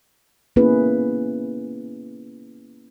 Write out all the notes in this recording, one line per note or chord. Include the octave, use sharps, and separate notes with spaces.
A#3 B3 C#4 E4 G#4 B4